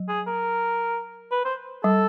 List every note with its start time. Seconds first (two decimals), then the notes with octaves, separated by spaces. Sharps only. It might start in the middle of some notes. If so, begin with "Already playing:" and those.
Already playing: F#3
0.09 G#4
0.27 A#4
1.32 B4
1.45 C5
1.84 G3 A4